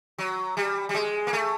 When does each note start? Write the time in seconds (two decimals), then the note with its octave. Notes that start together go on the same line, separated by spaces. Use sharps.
0.18 F#3
0.57 G3
0.89 G3
0.94 G#3
1.27 A#3
1.33 A3